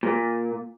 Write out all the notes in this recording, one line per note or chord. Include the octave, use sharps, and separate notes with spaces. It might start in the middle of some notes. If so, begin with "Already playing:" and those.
A#2